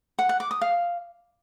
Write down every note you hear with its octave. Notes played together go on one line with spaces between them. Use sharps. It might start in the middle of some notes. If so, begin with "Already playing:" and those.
F#5
F#5
D6
D#6
F5